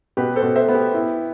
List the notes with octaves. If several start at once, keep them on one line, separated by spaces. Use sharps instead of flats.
B2 G4 B4
A4 C5
B2
C5 E5
B3
G4
E4